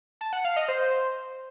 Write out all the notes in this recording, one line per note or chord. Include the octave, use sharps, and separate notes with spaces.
A5
F#5
F5
D#5
C5